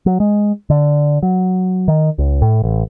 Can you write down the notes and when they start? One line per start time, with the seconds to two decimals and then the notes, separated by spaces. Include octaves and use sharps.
0.06 F#3
0.20 G#3
0.70 D3
1.23 F#3
1.88 D#3
2.18 C#2
2.42 A2
2.64 A1